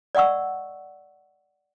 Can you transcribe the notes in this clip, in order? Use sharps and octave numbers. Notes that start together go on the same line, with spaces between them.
D5 D#5 F#5 C#6 E6